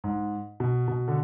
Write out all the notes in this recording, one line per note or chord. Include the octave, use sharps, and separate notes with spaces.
G#2
B2
B2
D3